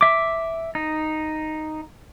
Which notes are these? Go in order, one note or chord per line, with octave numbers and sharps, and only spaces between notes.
E5 D6
D#4